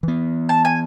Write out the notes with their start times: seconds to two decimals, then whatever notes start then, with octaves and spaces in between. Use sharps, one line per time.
0.03 E3 B3
0.49 A5
0.65 G#5